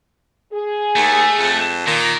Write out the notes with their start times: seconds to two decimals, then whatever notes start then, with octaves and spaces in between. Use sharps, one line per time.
0.53 G#4
0.96 D#2 A3
1.39 F2
1.87 A#2 D#3